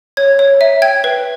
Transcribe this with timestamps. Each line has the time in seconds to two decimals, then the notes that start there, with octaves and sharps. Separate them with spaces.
0.17 C#5 G#6
0.39 C#5
0.61 E5
0.82 G5 G#6
1.04 B4